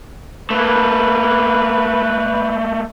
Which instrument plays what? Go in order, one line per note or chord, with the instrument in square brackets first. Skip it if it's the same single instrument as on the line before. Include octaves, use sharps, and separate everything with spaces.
[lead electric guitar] A3 A#3 [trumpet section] B4